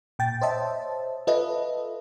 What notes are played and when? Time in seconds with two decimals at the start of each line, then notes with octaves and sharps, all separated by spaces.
0.19 A#2 G5 A6
0.41 C5 C#5 D#5 E5 A5
1.27 F4 A4 B4 D#5 E5